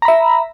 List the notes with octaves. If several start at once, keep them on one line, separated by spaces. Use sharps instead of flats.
E5 A#5 B5